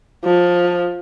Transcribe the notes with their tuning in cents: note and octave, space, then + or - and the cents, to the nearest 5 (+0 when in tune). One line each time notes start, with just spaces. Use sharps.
F3 +15